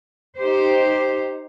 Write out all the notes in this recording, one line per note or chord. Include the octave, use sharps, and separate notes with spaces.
D#4 G4 C5